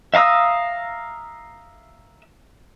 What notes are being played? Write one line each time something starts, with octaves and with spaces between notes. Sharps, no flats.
E5 F5 A#5 D#6 E6